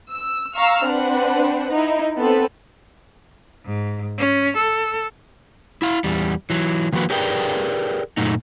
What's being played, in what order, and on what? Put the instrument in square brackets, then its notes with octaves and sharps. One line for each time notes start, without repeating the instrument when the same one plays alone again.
[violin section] E6
F5 A#5 C#6 E6 F6
C4 D4 B4 F#5
D#4 E4
B3 C4 A4 B4
[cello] G#2
C#4
A4
[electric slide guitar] E4 F5
E2 G3
E3 F#3
D#3 F3 A#3 F#4 B4
G4 G#4 A#4 B4 D5 G5
F#2 A#2 A3 D#4